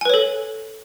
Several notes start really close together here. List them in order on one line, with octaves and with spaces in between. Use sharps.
G#5 B4 C#5 A4